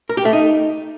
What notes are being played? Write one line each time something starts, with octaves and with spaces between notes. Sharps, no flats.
A#4
G4
A3
D#4